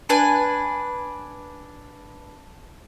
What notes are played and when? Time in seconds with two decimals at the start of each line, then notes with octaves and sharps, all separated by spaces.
0.09 D4 B4 G#5